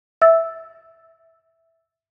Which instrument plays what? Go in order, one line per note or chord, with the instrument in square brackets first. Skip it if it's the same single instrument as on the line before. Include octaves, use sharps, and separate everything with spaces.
[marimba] E5 E6 A6